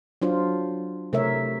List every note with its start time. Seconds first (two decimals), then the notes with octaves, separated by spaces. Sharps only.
0.22 F#3 D4 F4 C5
1.13 C3 A3 A#4 C#5 E5